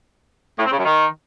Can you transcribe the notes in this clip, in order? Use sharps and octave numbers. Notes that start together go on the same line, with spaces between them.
A2
C4
C#3
F#2
D#3